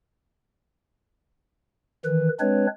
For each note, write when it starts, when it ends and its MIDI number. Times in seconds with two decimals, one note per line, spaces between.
2.05 2.28 51
2.05 2.28 52
2.05 2.28 71
2.40 2.67 56
2.40 2.67 60
2.40 2.67 62
2.40 2.67 71
2.40 2.67 73